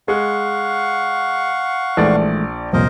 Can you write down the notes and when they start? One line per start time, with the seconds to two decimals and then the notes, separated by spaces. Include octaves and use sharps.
0.08 G#3 F5 F#5 C#6
1.97 A#1 E3 G#3 A3 D5
2.73 C2 F2 A#2 A#4 C5 D#5